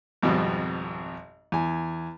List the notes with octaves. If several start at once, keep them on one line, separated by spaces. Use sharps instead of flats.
G#1 F2 B2 G3
E2 G#5